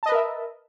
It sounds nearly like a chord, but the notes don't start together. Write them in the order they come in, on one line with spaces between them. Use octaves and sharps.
A5 D#5 B4 A#4 E5